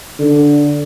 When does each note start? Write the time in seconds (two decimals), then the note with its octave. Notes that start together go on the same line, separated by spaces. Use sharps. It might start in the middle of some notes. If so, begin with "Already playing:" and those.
0.19 D3